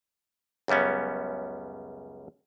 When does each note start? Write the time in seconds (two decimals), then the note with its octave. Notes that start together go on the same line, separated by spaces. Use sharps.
0.68 C#2 F#2 G3 B3 C#4